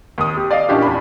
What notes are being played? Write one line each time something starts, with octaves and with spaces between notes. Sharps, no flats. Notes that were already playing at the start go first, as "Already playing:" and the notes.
D#2 D#6
G4
D5 D#5 F5
A#2 C#4 D4 E4 G4
E2 B5